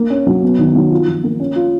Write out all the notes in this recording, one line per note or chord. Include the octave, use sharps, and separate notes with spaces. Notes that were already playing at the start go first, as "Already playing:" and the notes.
Already playing: A#3
C#4
F#3
B3
D#3
F#3
F4
F3
A#3
C#4
F4